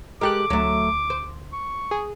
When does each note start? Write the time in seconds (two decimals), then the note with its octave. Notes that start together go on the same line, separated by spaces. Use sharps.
0.21 G#3 G4 A4 A#4 D6 F#6
0.50 D2 F#3 A3
1.10 C5
1.53 C#6
1.91 G#4